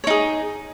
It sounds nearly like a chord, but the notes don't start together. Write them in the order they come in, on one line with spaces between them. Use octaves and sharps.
C#5 D#4 G#4